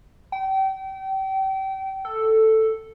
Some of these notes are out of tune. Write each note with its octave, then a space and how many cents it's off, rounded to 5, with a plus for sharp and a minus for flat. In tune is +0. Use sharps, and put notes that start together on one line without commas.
G5 -30
A4 +5